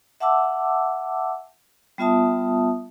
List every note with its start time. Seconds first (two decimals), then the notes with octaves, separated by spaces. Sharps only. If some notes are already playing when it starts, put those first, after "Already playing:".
0.20 E5 F#5 A5 D6 E6
1.98 G3 B3 F4 E5 A5 D#6